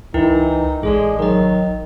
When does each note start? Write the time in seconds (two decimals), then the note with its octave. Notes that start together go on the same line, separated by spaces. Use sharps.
0.14 C#2 E3 D#4 E4 A#4 G5
0.83 A1 G#3 G#4 A4 D5
1.19 D#3 F#3 A#4 D#5